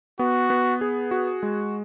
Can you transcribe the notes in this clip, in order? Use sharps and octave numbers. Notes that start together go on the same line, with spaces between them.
B3 F#4
B3
G#4
F#4
G#3